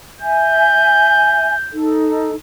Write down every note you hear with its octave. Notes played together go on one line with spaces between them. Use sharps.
E5 G#5 G6
D#4 A4